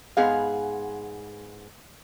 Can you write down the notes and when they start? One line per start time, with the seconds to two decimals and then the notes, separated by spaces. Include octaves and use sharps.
0.17 G#2 B3 G#4 F5